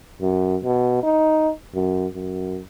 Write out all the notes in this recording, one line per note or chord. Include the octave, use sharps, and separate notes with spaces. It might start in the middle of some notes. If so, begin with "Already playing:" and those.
F#2
B2
D#4
F#2
F#2